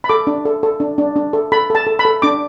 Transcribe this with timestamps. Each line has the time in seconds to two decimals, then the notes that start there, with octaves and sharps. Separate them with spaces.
0.04 B5
0.09 A4 D6
0.27 D4
0.45 A4
0.63 A4
0.80 D4
0.98 D4
1.16 D4
1.33 A4
1.52 A4 B5
1.70 A4 A5
1.87 A4
1.99 B5
2.05 A4
2.22 D4 D6